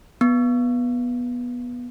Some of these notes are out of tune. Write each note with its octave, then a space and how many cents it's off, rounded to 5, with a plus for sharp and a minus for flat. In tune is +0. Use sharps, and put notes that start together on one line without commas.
B3 -15